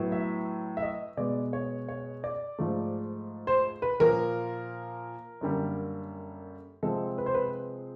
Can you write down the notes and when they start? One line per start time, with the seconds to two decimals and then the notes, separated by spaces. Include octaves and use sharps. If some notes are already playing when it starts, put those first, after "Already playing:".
Already playing: A2 F#3 B3
0.12 E5
0.77 E5
0.82 D#5
1.17 B2 G#3 B3 D5
1.53 C#5
1.89 C#5
2.24 D5
2.59 G#2 F3 A3
3.47 C5
3.82 B4
4.00 A#2 F3 A#3 A#4
5.41 F#2 D3 G3 A#3
6.83 C3 F3 G#3 C4 A4
7.18 B4
7.26 C5
7.34 B4